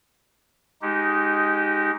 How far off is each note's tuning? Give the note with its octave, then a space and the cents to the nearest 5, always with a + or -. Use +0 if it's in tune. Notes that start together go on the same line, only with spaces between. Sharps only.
G#3 +0 D#4 +0 G4 -25